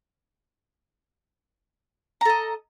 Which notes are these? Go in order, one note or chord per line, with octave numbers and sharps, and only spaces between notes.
A4 D#5 A#5